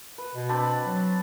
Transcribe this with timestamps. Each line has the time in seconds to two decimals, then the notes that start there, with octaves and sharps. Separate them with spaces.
0.18 B4
0.34 B2
0.49 C4 D4 B4
0.84 F#3